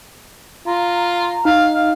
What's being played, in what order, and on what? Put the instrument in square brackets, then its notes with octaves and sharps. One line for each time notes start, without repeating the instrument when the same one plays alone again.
[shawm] F4 [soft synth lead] A#5
[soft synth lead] D#4 [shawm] F5
[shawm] F5